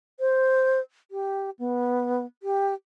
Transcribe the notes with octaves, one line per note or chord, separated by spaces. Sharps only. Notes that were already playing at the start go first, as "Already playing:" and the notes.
C5
G4
B3
G4